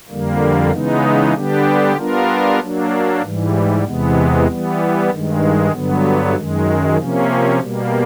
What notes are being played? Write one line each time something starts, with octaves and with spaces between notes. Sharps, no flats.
F2 D3 G3 A#3
C#3 E3 G#3 B3 D#4
D3 G3 B3 D4 G4
G3 B3 D4 F4 A#4
F#3 A#3 D4
G#2 E3 G3
E2 C3 E3 G#3 B3
E3 G3 B3
G2 D#3 G#3
G2 D3 F#3 B3
F#2 D#3 G#3
C3 F3 A#3 C#4
B2 G3 A#3